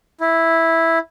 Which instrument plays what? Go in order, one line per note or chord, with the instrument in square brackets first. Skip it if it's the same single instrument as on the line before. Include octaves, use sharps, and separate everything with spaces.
[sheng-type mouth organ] E4